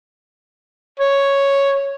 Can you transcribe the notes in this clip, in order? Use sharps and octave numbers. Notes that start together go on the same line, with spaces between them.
C#5